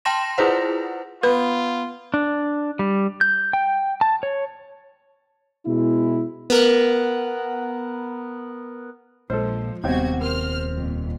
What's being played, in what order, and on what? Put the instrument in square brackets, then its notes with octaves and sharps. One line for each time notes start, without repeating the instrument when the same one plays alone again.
[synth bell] G5 A5 C6 A#6 E7
E4 F4 G#4 B4 C5 F#5
[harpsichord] B3 [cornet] F4 [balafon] B4
[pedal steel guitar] D4
G3
G6
G5
A5
C#5
[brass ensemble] B2 G#3 E4
[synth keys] B3 A#4 F#6
[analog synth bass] A#1 [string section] F3 [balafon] G#3 [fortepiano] A4 C5
[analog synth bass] D#1 [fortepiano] C3 C4 [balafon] G3 B3 [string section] F#4 G#6
[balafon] A#4 [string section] C5 F6
[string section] F2 A#2